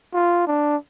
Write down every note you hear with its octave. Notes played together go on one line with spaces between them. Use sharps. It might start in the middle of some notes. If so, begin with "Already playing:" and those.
F4
D4